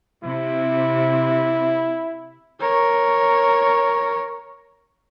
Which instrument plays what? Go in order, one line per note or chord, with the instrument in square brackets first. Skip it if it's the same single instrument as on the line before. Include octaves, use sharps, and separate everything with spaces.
[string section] C3 [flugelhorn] E4
[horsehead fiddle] A#4 C#5